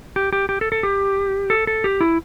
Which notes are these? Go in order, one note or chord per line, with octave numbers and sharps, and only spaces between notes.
G4
G4
G4
A4
A4
G4
A4
A4
G4
E4